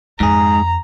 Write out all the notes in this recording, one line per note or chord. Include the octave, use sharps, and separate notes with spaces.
F2 G#2 E4 G#4 A#5